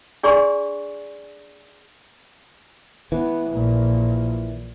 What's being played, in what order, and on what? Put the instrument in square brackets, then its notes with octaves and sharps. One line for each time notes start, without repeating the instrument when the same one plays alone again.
[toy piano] D4 G#4 D5 G#5 C6 C#6
[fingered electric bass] E3 [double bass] B3
[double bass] A#1 A#2